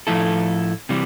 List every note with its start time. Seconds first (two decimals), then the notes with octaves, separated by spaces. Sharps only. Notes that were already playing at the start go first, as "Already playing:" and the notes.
0.07 A2 F3 A3 E4 A4
0.89 C3 E3 G3